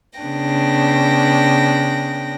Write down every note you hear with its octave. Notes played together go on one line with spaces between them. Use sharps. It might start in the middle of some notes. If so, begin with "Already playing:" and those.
C#3 B3 D4 G5 A#6